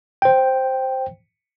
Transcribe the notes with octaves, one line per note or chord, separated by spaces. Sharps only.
C5 G5